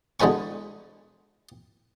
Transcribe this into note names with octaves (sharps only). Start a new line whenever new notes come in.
B1 D3 G#3 B4 G#5 C#6